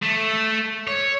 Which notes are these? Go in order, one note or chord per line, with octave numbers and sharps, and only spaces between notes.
A3
C#5